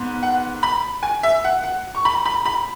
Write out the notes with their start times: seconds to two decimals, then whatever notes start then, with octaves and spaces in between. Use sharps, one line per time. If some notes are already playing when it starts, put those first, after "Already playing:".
Already playing: G#2 B3
0.23 F#5
0.63 B5
1.03 G#5
1.23 E5
1.44 F#5
1.63 F#5
1.95 C#6
2.05 B5
2.25 B5
2.45 B5